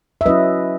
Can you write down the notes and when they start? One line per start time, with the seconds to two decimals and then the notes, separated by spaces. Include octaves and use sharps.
0.21 E5
0.26 F#3 C#4 E4 B4 D#5